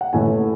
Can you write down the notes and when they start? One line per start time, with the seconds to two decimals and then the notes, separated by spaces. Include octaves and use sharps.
0.01 F#5
0.13 A1 A2 E3 A3 E4 G#5